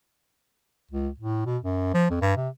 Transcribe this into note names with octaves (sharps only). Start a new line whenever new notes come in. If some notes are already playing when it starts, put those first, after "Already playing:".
C#2
A2
B2
F#2
F3
F2
G2
C3